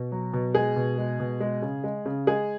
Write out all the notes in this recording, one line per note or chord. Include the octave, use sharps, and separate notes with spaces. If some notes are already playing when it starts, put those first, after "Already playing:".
Already playing: B2
F#3
B2
G#3 G#4
B2
G#3
B2
G#3
C#3
G#3
C#3
G#3 G#4